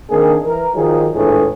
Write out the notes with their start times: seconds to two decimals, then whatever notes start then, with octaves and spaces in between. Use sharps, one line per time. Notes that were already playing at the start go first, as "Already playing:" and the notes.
0.10 D#3 A#3 C4 D4 G#4
0.43 E3 A#4
0.75 D#3 F3 F#3 D#4 G#4
1.14 G#1 C#2 A2 E3 D4 G#4